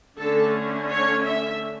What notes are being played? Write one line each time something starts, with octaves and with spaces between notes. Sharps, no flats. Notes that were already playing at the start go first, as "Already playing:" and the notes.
D3 A3 C#4 A4
C#5
E5